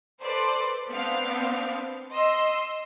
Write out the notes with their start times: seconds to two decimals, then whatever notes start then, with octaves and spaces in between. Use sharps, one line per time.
0.21 A4 B4 C5 D5
0.89 B3 C4 D4 F5
2.13 D#5 C6 E6